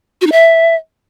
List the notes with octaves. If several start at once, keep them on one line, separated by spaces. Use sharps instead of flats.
F#4
D#4
E5